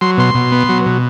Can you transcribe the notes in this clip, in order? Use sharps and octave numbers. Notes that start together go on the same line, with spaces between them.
F#3 C6
B2 C6
B2
B3
F#3
B2